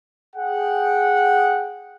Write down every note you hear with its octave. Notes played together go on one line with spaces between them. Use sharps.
G#4 F#5 G5